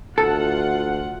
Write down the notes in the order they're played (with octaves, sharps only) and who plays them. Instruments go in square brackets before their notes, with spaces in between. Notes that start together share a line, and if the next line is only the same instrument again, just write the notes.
[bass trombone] D2 [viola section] F4 F#5 [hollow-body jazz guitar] A4